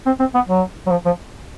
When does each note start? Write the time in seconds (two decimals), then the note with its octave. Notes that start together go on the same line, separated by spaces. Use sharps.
0.06 C4
0.20 C4
0.35 B3
0.49 F#3
0.86 F#3
0.90 F3
1.05 F3